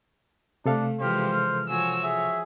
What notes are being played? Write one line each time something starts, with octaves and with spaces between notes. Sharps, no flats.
C3 A3 D4 A4 F5
E3 F3 G#3 G4 C5 F6
F6
F3 F#4 C#5 G#5 E6
G#4 E5